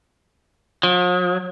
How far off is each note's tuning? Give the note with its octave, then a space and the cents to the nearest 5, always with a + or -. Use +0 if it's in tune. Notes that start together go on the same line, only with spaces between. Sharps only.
F3 +45